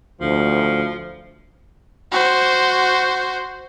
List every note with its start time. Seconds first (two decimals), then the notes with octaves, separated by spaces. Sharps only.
0.21 D2 F3
2.12 F#4 C5